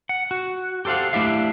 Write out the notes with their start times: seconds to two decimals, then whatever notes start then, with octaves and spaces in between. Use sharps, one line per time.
0.09 F#5
0.31 F#4
0.85 G4 A4 C5 F5 F#5
1.13 A3 D4 E4 G4 E5 F5